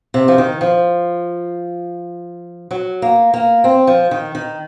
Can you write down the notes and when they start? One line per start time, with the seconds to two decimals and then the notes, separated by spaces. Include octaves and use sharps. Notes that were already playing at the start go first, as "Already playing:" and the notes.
0.14 C3
0.28 F3
0.38 D#3
0.61 F3
2.71 F#3
3.02 A#3
3.34 A#3
3.64 C4
3.87 F3
4.11 D#3
4.35 D#3